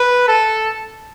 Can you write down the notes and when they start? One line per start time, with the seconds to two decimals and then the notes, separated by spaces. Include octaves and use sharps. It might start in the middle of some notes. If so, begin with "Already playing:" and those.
Already playing: B4
0.28 A4